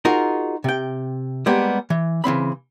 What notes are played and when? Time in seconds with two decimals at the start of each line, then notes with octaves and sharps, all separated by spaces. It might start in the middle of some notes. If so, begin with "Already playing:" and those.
0.05 D#4 F4 F#4 G#4 A#4
0.64 C3 G5
1.46 G3 G#3 A#3 B3 G4
1.90 E3
2.24 C#3 E3 C4 B5